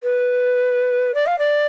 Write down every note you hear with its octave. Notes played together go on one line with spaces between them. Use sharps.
B4
D5
F5
D5